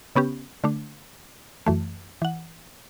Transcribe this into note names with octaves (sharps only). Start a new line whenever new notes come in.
C#3 B3 C#4 G4
D3 A3 D4
F#2 E3 A3
E3 F#5